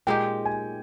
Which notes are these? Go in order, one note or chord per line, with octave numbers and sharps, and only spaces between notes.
A#2 G#3 D#4 G4 G5
G#5